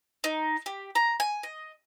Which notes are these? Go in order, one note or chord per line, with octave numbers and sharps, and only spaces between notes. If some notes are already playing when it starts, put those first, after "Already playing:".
D#4
G4
A#5
G#5
D#5